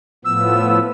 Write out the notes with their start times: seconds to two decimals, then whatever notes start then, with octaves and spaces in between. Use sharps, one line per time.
0.25 A2 F3 B3 E6